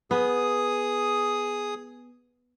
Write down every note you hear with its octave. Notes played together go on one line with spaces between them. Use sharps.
B3 G#4 D#6